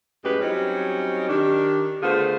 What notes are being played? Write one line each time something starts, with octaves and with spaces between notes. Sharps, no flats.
F#2 A2 G#3 G4 B4
F#3 G3 C4 C#4 D#4
D#3 D4 G4
D3 A3 B3 F4 G#4 C5